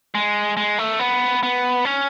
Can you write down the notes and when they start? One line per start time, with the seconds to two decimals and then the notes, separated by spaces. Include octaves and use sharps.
0.15 G#3
0.57 G#3
0.78 A3
0.99 B3
1.43 B3
1.85 C#4